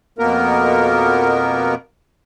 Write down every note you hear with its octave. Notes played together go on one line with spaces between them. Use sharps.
F2 B2 A#3 B3 A#4